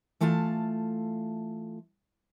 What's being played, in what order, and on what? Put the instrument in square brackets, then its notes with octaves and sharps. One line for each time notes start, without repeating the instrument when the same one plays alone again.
[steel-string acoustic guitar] E3 A3 F4 F5 G5 A5